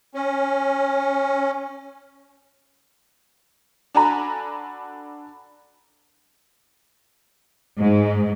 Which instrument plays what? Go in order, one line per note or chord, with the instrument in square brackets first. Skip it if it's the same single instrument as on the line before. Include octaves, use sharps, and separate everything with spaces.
[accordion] C#4
[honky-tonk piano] D4 F#4 A4 G#5 A#5 B5
[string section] G#2